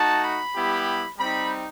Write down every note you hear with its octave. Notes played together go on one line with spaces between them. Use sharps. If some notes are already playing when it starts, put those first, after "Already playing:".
Already playing: A3 D#4 F#4 A5
B5
G3 B3 E4 G4
G3 C4 D#4 B5